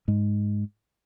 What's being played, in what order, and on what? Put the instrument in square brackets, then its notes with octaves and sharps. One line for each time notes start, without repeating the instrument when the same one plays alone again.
[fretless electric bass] G#2 G#3